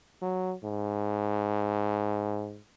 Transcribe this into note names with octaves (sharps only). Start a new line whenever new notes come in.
F#3
G#2